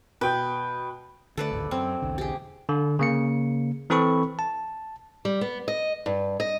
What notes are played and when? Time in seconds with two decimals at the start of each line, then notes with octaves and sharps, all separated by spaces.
0.21 B2 B4 G5 G6
1.37 D3 A3 A4 B4 D5
1.51 G#1 D2 A2
1.71 F#2 C4
2.02 B1 E2 D3
2.18 G4 G#4
2.69 D3
2.99 C#3 A#3 C#7
3.90 E3 C4 A4 B5 C#6
4.39 A5
5.25 G3
5.41 B3
5.68 D#5
6.06 G2
6.40 D#5